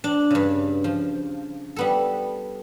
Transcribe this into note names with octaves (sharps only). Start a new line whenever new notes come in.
D4
G2 C#3
F3
G3 B3 A4